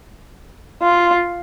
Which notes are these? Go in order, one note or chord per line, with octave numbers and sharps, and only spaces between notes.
F4